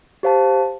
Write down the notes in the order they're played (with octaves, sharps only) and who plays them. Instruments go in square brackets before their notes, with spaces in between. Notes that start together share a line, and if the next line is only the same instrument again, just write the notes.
[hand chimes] G4 C5 F5 A5